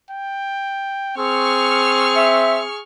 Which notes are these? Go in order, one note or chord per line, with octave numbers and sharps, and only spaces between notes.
G5
C4 G#4 C#6 F6
E5